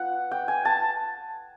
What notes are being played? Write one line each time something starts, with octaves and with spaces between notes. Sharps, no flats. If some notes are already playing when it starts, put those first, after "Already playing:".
Already playing: B3 F4 F#5
G5
G#5
A5